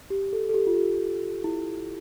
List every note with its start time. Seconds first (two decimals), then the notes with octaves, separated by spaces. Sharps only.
0.10 G4
0.33 A4
0.49 A4
0.54 G4
0.67 F4
0.77 G4
1.44 E4